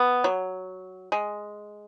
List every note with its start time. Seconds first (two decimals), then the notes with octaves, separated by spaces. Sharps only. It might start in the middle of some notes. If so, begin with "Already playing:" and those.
Already playing: B3
0.24 F#3
1.12 G#3